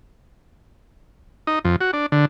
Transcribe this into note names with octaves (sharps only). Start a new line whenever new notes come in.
D#4
F2
F#4
D4
D3